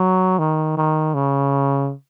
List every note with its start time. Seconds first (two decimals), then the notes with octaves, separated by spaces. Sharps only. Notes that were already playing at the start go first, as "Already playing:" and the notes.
Already playing: F#3
0.39 D#3
0.77 D#3
1.15 C#3